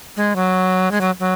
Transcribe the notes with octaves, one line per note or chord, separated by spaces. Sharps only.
G#3
F#3
G#3
F#3
F#3